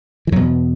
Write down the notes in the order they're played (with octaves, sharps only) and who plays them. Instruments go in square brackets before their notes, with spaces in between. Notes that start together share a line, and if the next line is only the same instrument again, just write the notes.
[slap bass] E3
E2 F#3
B2